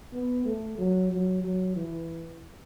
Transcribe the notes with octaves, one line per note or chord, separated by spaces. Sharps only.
B3
A3
F#3
F#3
F#3
E3